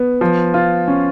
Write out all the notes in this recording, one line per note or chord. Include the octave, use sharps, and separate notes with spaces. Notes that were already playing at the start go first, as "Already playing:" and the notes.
Already playing: B3
F3
F4
C#4